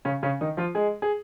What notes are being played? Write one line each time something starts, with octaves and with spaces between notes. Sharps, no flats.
C#3 C#4
C#3 C#4
D#3 D#4
F3 F4
G#3 G#4
G#4